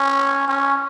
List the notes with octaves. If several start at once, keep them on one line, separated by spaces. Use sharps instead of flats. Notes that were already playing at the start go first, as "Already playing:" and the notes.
Already playing: C#4
C#4